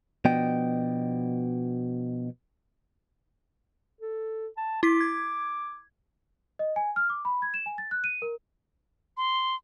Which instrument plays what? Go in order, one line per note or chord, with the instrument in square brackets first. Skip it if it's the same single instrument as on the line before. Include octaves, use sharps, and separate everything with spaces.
[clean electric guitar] B2 F3 B3 D4 D#5 G5
[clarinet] A4
A5
[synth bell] E4 B6 [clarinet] D6
[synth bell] G#6
[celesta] D#5
G#5
F6
D6
B5
G#6
E7
G#5
A6
F#6
D#7
A#4
[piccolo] C6